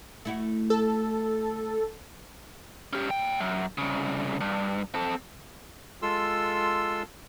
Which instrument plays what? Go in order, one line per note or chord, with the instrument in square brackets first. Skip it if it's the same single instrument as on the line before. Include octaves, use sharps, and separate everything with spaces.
[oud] A3 E4 F#4
[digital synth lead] A4
[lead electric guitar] C#4 G4
A#2 G5
F#2
C2 C#3
G2
C4 A4
[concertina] G#3 F4 A4 C6 E6